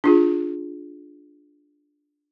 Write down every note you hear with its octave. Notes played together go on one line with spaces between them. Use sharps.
D4 F4 G#4